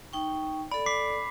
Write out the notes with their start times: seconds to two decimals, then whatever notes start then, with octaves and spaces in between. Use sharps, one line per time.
0.13 D#4 G5 C#6
0.72 A4 D5 B5
0.86 D6 B6 C7